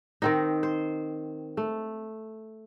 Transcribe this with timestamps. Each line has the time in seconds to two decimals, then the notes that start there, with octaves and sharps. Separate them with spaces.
0.22 D#3 C4 D#4
0.63 C5
1.57 A3